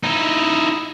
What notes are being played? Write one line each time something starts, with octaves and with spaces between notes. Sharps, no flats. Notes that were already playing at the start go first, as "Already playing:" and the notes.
D#4 E4